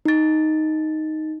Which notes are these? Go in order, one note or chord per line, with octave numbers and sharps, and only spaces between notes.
D#4 A6